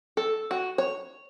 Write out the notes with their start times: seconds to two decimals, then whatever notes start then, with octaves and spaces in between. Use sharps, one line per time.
0.17 A4
0.51 F#4
0.78 C#5